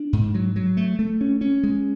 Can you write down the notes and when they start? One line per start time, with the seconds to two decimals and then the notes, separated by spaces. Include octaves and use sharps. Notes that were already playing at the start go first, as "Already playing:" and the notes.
Already playing: D4
0.13 G#2
0.34 F#3
0.56 F#3
0.77 A3
0.99 A3
1.21 C#4
1.41 C#4
1.63 G#3